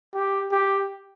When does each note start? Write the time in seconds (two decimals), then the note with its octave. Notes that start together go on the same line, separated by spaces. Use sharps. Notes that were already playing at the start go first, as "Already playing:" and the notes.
0.15 G4
0.51 G4